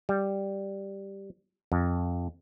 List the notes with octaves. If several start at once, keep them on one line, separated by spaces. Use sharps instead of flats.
G3
F2